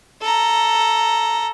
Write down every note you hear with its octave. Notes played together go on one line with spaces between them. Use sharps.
A4 A#5